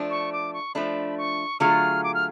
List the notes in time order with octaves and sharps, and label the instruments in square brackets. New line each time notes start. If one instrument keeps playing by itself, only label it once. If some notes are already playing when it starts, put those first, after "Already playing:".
Already playing: [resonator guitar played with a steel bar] F3 A3 D4
[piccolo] C#6
D6
C#6
[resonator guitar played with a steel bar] F3 A3 D4 [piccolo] B5
[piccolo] C#6
[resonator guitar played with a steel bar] D3 F#3 A3 F4 G#4 [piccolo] F6
[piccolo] D6
F6